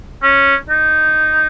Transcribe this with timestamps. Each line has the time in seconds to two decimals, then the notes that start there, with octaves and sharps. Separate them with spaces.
0.22 C#4
0.69 D#4